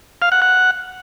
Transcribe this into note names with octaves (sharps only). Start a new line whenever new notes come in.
F5
F#5
F#5